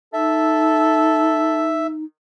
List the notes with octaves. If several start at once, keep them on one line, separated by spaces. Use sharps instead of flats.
D#4 A4 E5